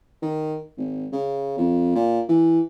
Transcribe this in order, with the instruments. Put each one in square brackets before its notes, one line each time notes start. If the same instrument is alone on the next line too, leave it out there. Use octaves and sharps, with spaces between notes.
[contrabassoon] D#3
G#1
C#3
F2
A#2
E3